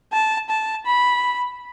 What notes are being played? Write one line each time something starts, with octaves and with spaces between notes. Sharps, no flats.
A5
A5
B5